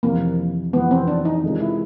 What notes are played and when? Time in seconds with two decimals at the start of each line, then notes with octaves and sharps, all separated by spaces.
0.03 F2 C3 E3 A#3
0.73 F2 C3 E3 B3
0.91 C4
1.07 D4
1.25 D#4
1.43 C3 D#3 G#3 C#4 F4
1.60 E4